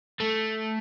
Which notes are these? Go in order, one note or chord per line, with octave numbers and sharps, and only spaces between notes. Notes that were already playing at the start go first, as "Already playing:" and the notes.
A3